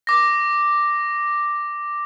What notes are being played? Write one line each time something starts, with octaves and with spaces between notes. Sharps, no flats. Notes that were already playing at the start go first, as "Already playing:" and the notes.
D6 A#6